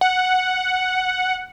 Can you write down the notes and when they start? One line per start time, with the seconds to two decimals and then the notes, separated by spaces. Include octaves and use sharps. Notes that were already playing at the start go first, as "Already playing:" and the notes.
0.01 F#5